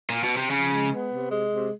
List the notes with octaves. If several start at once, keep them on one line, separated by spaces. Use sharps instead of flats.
A#2
B2
C3
C#3 F3
G#3
B3
C3
G#3
C3